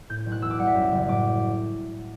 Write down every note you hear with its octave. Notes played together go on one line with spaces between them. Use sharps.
A2 G6
G6
B1
F#6
E2 E6
D6
G3 F#5
E5
F#2
F#1
A2 D6